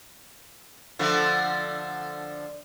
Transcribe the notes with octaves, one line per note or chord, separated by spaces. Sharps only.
D3 F3 A3